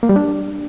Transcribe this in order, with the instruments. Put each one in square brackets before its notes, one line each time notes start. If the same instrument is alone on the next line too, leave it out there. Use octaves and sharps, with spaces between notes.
[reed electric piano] A#3
G3
D4